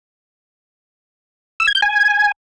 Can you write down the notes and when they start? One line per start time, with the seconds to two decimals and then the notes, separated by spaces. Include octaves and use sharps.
1.60 E6
1.67 G#6
1.75 G6
1.82 G#5